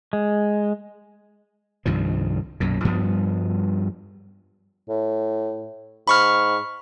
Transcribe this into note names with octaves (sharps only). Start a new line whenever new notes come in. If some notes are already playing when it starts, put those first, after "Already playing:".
G#3
C2 G2 D#3 F3
B1 F#2 A#2
G2 F3 G3 B3
A2
G#2 B5 C#6 F6